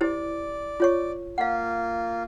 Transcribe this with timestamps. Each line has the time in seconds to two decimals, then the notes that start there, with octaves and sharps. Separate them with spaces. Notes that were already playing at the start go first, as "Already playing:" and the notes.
0.01 E4 G4 C5 D5
0.80 F4 C#5 C#6
1.38 A#3 F4 F5 F#5